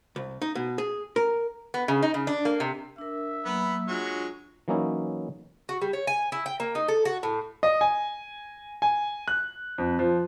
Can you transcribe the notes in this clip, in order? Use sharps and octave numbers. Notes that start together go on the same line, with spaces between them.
C2
D#4
B2
G#4
A#4
B3
C#3
D#4
C#3
D4
A#3
C3
D4 A#4 E5
F#3 A#3 B3 B5
F#3 G#3 D4 F4 C#6
E3 F#3 A#3 C#4 D#4 E4
F#4
G3
C#5
G#5
E4
G5
A#3
D#4
A4
F#4
A2
D#5
G#5
G#5
F#6
F2
F3